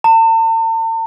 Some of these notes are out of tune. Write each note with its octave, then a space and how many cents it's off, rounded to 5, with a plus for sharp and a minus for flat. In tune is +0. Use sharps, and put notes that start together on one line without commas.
A5 +45